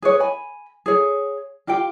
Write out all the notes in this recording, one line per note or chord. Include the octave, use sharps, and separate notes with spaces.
G#4 B4 C#5
G#5 B5
G#4 C#5
F4 G4 F5 G5